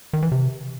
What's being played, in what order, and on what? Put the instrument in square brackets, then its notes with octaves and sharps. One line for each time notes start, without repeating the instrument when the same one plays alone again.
[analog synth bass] D#3
E3
C3